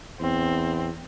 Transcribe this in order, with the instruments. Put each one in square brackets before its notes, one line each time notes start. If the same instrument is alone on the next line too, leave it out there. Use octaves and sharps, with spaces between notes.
[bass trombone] E2 [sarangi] C4